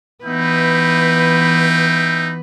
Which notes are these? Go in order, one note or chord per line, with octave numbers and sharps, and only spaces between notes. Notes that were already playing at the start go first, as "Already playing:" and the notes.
E3 B3 D#4 B4 E5 G5